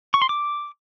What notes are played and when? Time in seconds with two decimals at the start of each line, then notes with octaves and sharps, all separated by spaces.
0.14 C#6
0.22 C6
0.29 D6